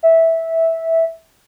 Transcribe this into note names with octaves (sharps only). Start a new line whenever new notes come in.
E5